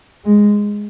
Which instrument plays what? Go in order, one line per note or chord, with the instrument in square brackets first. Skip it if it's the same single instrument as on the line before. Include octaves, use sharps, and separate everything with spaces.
[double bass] G#3